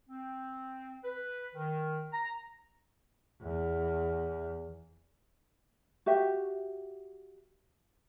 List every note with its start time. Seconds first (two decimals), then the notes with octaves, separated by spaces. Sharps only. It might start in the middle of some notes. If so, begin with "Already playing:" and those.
0.09 C4
1.04 B4
1.55 D#3
2.13 A#5
3.42 E2
6.06 F#4 G4 E5